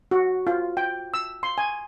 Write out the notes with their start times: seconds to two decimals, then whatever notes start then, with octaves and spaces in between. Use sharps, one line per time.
0.11 F#4
0.47 F4
0.77 G5
1.14 E6
1.43 C6
1.58 G#5